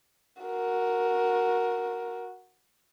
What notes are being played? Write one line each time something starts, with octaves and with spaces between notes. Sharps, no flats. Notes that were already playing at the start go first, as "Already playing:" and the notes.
F#4 A#4